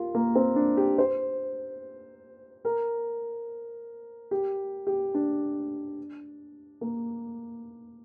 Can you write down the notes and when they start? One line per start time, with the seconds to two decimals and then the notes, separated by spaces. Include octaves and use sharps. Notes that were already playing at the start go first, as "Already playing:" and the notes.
Already playing: F4 G4 A#4
0.15 A#3
0.35 C4
0.56 D4
0.77 G4
0.98 C5
2.65 A#4
4.31 G4
4.87 G4
5.14 D4
6.81 A#3